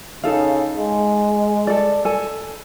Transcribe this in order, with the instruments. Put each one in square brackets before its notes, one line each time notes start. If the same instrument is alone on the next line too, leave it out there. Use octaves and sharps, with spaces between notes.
[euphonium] C#3 [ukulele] D#4 A4 F5
[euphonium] G#3
[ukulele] A4 D5
A4 G#5